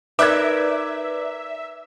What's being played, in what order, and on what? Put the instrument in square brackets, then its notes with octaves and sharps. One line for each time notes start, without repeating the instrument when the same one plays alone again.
[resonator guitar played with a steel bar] D#4 A#4 [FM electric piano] B4 D5 [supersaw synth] E5 [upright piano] D6 F#6 G#6